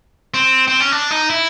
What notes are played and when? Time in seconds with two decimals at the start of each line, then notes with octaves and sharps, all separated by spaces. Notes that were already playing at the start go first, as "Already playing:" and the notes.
0.34 C4
0.68 C4
0.80 C#4
0.92 D4
1.11 D#4
1.30 E4